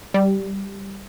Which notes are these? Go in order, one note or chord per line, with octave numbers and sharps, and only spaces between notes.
G3